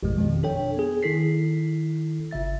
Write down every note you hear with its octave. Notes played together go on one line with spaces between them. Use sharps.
A1 F2 B2 F3 G#3
F2 B2 D#3 F3
D4 A4 C#5 G5
B3 G#4
D#3 E4 A4 B6 C7
G1 C#3 E5 A6